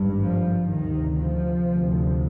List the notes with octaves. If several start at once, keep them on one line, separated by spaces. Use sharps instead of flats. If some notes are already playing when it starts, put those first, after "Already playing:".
Already playing: G#1 G2
F3
D2 C3 D#3
F3
D2 C3